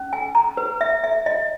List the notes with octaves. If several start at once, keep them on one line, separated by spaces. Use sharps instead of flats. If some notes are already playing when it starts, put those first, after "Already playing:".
Already playing: C#4
G#5
A#5
B4
E5
E5
D#5